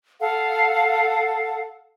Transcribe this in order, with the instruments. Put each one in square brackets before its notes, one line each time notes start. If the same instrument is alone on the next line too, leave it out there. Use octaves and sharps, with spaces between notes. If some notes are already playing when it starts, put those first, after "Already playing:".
[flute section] A4 F5 F#5